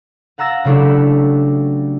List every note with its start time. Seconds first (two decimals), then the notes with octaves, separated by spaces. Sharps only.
0.38 F5 F#5 A#5 E6 A6 A#6
0.65 C#3 F#3 A3 D4 E4 G4